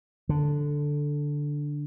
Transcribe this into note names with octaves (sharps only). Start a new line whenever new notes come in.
D3